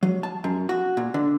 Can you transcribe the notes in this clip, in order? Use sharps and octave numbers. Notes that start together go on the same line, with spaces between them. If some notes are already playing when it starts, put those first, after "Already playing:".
F#3
A5
F#2
F#4
A#2
D3